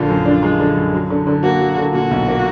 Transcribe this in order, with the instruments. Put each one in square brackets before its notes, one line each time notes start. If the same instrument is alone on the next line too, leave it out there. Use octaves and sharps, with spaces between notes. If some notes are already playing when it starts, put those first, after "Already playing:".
Already playing: [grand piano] A#1 D3 [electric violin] F4
[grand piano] F#2
D4
G#3
D3
F#2
F#3
D3
D3
[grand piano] A#3 [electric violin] F#4
[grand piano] F#3
D3
[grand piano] A#2 [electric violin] F#4
[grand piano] B1
A#3